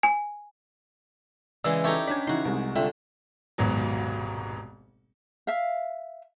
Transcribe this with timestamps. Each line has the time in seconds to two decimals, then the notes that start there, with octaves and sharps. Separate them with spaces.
0.03 G#5
1.64 C#3 E3 G#3 D5 E6
1.84 D#4 E4 G4 A4 C#5
2.07 C#4 D4 D5 G#6 B6
2.27 C#3 E3 D#4 F#4 C6
2.45 C2 G3 G#3
2.75 D3 F4 E5 G5
3.58 D#1 G#1 G#2 B2 F#3
5.47 E5 F5